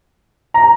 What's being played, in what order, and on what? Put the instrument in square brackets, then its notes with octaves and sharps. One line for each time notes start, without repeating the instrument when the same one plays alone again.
[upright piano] A#5